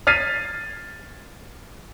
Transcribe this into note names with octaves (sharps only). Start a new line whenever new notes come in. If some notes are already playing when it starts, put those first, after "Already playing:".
F6 G#6 A6 B6 C7 D#7